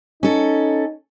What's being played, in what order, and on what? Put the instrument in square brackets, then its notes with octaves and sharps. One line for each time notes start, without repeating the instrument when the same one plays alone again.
[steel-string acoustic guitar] C#4 A4 [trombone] D#4